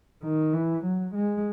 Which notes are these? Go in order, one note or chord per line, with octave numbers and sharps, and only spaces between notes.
D#3
E3
F#3
G#3